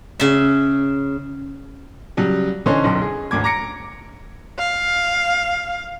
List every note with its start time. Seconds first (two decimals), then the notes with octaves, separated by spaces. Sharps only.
0.20 C#3 E5
2.17 C#3 F#3 G3
2.66 D3 E3 C#4 D#4 C5 C#5
2.84 B1 F#2 C6
3.02 G#4
3.31 G#1 D2 D6 G#6
3.44 A#5 D6 A#6 C#7 D7
4.58 F5